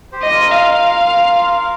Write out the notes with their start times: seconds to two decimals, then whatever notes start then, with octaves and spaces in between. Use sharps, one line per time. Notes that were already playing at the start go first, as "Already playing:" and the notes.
0.12 G4 C5
0.22 D#5
0.31 F4 A#4
0.51 F5
1.07 F4 A#4